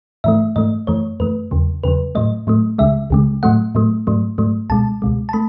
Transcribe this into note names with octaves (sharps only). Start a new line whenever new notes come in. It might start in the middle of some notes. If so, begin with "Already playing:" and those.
G#2 E3 A3 E5
G#2 E3 A3 D#5
F#2 E3 A3 C#5
F#2 E3 A3 B4
E2 C#3 F#3
E2 C#3 F#3 B4
A2 F#3 A3 D#5
A2 F#3 A3
C#2 C#3 G#3 E5
C#2 C#3 G#3
A2 F#3 A3 F#5
A2 F#3 A3
G#2 F#3 A3
G#2 F#3 A3
C#2 B2 G#3 A5
C#2 B2 G#3
A5
A3 B5